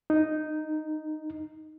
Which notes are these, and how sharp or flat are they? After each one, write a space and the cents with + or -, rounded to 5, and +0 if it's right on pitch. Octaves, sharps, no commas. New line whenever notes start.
D#4 -5